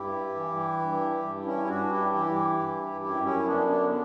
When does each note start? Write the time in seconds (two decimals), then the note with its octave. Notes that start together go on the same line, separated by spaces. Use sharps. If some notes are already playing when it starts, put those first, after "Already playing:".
Already playing: G2 E4 G4
0.35 E3
0.79 G2
1.24 G2
1.45 C#4 E4
1.67 G2 D4 F#4
1.90 E4 G4
2.12 E3 E4 G4
2.57 G2
3.01 F#2 E4 G4
3.23 C#4 E4
3.45 D3 B3 D4
3.67 B3 D4
3.89 D4